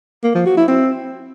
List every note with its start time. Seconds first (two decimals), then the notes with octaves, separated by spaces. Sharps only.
0.24 A#3
0.35 F3
0.46 F#4
0.57 E4
0.68 C4